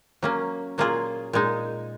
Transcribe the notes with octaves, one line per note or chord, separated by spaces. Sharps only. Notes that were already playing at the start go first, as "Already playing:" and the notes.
F#3 A#3 C#4
A#2 F#3 A#3 F4 G#4
A#2 G#3 D#4